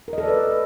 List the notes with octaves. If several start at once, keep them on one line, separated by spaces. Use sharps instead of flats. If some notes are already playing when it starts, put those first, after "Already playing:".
A#4
D#5
A4
D5
B4